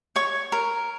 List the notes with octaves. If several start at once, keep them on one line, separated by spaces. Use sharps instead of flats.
C#5 C#6
A#4